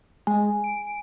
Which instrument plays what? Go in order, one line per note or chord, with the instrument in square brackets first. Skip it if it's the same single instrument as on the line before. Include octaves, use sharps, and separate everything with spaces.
[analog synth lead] G#3 [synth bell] G#5
[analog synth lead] D7